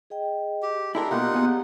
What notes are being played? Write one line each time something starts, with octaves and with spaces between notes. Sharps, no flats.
G#4 D#5 G5
G4
G#3 D4 E4 G4 A4 A#4
B2 A#3 D#4 F4 G4 F#5
B3 G#4